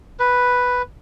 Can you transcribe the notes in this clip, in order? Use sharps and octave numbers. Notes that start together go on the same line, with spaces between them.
B4